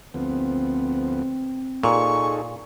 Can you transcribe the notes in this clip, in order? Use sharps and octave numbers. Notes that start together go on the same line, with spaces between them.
D2 F3 B3 C4
A#2 D#4 G#4 A4 C#6